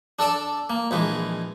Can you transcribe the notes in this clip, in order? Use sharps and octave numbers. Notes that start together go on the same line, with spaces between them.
D4 A4 D5 A5
A#3
A#1 E3 G#3